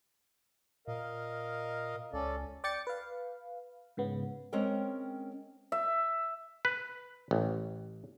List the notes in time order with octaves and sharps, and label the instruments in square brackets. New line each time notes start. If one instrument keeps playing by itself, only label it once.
[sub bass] A#2 [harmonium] A#4 D#5 F5
[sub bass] C#2 [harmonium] C#4 A4 D5
[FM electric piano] D5 G5 A6 C#7
B4 F5
G#2 C#3 B3
[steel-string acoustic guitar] G#3 C4 C#4 A#4 G5
[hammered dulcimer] E5
[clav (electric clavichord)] B4
A1